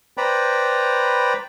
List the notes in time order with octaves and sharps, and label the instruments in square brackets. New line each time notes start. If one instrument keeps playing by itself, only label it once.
[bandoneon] B4 C5 D5 G5 A#5 B5